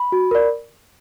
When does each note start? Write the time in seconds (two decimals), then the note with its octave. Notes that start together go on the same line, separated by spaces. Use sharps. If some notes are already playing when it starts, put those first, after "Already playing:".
Already playing: B5
0.12 F#4
0.31 A#4 D5